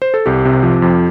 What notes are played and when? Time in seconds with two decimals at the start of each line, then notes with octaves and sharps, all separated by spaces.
0.02 C5
0.14 A4
0.26 C2 G4
0.45 C3
0.63 F3
0.82 F2